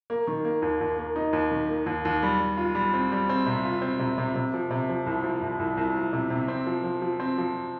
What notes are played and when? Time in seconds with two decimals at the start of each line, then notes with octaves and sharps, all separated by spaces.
0.10 A#3
0.27 D#3
0.45 A#3
0.62 D#2
0.81 D#2
0.98 A#3
1.16 D#4
1.33 D#2
1.51 D#3
1.69 A#3
1.86 D#2
2.05 D#2
2.23 G3
2.40 G3
2.57 F4
2.75 G3
2.94 C4
3.12 G3
3.29 C4
3.46 C3
3.65 F4
3.82 C4
3.99 C3
4.18 C3
4.36 C3
4.54 F3
4.71 C3
4.89 F3
5.06 C2
5.24 F3
5.42 C2
5.59 C2
5.77 C2
5.96 F3
6.13 C3
6.30 C3
6.48 C4
6.66 F3
6.84 F3
7.02 F3
7.20 C4
7.38 F3